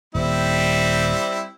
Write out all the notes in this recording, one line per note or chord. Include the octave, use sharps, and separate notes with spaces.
D#1 G3 C4 E4